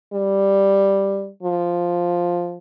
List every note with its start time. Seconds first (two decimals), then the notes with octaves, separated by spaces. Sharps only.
0.13 G3
1.42 F3